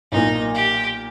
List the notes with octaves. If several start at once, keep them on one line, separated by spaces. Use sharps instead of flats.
B1 A#2 A#3 D#4
G4